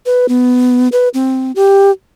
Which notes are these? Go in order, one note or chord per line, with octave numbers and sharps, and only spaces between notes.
B4
B3
B4
C4
G4